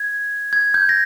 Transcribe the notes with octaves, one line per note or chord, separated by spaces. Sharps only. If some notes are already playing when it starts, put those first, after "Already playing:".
Already playing: G#6
G#6
G6
A#6